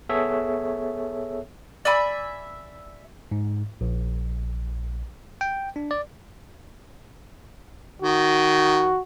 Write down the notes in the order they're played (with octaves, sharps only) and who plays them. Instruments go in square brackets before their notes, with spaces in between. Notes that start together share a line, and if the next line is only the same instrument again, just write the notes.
[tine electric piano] B3 G#4 A4 C#5 E5
[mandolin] D5 E5 G#5 B5
[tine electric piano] G#2
A#1
G5
D4
D5
[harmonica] D#3 [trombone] F#4